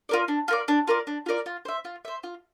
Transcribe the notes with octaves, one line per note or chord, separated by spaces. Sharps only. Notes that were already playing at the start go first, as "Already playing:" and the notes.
F4 A#4 D5
D4
F4 A#4 D5
D4
F4 A#4 D5
D4
F4 A#4 D5
F4
C5 E5
F4
C5 E5
F4